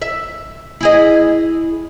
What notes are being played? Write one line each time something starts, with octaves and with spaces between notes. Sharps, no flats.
E5
E4 G#4 D#5